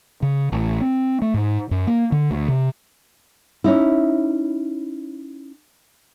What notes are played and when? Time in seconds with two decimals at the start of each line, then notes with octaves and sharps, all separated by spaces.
0.23 C#3
0.52 A1
0.81 C4
1.22 A3
1.34 G#2
1.71 F#2
1.87 A#3
2.12 D3
2.31 D2
2.48 C3
3.64 C#4 D#4 E4